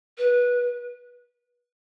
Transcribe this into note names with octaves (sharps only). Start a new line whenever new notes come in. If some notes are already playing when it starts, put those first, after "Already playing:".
B4